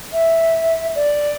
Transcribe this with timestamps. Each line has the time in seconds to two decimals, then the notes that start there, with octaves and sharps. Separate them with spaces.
0.13 E5
0.96 D5